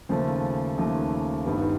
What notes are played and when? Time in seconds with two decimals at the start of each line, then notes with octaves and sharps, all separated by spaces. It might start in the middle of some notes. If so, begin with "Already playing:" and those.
0.09 D#2 C#3 F3 A3
0.77 D#2 C#3 F3 A3
1.46 G1 G2 D#3 G3 B3